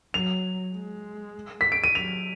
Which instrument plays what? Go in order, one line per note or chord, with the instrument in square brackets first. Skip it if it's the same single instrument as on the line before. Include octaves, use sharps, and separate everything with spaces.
[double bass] F#3 [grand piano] F7
[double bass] G#3
[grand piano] B6
D7
D#7
[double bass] F#3 [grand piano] F7